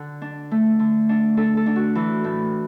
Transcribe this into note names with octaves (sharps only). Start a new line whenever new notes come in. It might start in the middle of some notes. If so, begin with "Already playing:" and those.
Already playing: D3 F#5
D4
A3
D3
D4
D4 A4
A4
D4
F#4
E3 E4
A2